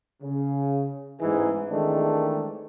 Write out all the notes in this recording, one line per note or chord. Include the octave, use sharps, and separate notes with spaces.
C#3
A1 E2 G#2 E3 D#4 G#4
D#3 E3 G#3 A3 C4 D4